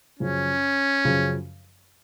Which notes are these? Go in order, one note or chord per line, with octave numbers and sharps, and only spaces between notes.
F#2 C#3 F3 C#4
F#2 C#3 F3